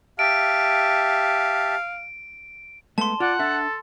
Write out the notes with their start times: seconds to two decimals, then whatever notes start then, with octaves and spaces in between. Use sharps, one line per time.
0.19 G4 E5 F5 A5 D7
2.98 G#3 A3 B3 A5 C6
3.20 F4 D5 F#5
3.39 D4 A4 E5